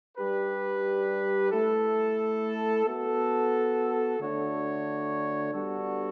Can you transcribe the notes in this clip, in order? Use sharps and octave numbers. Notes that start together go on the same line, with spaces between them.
G3 D4 G4 B4
A3 E4 A4
B3 F#4 A4
D3 A3 D4 F#4 C#5
G3 B3 D4 F#4 A4